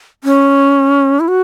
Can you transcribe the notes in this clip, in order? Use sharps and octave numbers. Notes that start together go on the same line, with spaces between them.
C#4
E4
F#4